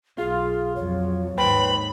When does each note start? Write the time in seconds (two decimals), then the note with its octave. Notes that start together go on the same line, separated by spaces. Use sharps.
0.18 B1 F4 G#4 F5
0.76 F2 F#3 C#5
1.38 D#2 G#2 B4 C5 G5 B5